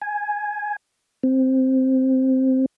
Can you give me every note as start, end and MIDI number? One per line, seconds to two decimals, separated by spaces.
0.02 0.76 80
1.23 2.66 60